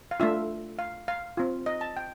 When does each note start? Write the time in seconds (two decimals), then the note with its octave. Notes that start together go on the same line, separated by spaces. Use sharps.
0.11 F5
0.20 A3 D4 F4 E5
0.79 F5
1.08 F5
1.37 C4 F4
1.66 D#5
1.81 A5
1.97 G5